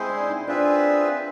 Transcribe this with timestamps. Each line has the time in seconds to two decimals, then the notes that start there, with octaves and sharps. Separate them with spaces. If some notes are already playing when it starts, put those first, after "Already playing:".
Already playing: G#3 C4 E4 G#4 C5
0.10 D4
0.29 D#4
0.47 C4 D4 F4 G#4 B4 E5